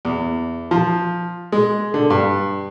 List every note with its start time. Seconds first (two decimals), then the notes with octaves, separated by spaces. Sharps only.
0.05 E2
0.71 F3
1.52 G#3
1.94 D3
2.10 G2